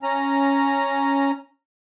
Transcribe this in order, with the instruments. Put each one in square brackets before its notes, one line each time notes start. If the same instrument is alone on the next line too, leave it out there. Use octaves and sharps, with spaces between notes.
[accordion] C#4 A#5